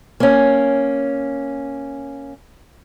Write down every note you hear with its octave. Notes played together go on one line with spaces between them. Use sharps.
A#3 C#4